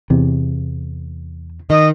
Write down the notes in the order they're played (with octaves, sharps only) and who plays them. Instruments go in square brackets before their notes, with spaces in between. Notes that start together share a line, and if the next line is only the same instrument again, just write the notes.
[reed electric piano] E2 [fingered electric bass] C3
[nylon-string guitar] D#3 [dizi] D#5